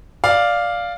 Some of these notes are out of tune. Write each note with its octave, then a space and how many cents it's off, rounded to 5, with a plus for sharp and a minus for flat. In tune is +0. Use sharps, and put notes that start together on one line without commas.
D5 +0 F5 +0